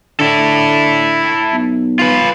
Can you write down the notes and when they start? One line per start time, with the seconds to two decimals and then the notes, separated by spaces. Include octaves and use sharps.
0.20 D3 E4 A4
1.52 B1
1.99 F4 B4